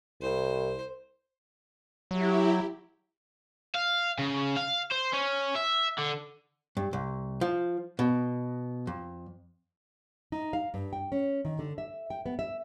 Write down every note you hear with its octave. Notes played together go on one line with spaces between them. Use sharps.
C2 C5
F#3 E4 G4
F5
C#3
F5
C5
C#4
E5
D3
G2
C2
F3
B2
F2
D#4
F5
G2
G5
C#4
D#3
D3
E5
G5
B3
E5